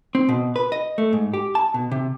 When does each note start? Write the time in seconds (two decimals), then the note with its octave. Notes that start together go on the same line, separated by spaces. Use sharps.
0.15 C4
0.29 B2
0.56 B4
0.72 D#5
0.98 A3
1.13 G#2
1.33 G4
1.55 A5
1.74 B2
1.91 C3